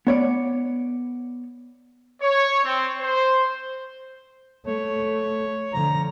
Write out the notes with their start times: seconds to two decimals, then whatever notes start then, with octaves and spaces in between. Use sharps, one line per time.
0.07 B3 C#5 D5
2.21 C#5
2.64 C4
3.01 C5
4.67 A3 C#5
5.73 D3 F3 A#5